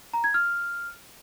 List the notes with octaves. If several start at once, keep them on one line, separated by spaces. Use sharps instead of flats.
A#5
G#6
F6